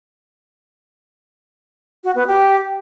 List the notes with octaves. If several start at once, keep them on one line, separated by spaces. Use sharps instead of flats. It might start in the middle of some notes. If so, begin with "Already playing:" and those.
F#4
B3
G4